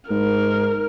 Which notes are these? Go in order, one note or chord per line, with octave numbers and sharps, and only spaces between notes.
G#2 A#4